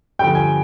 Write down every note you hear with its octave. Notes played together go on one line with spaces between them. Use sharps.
G2 D3 F3 G5
G#5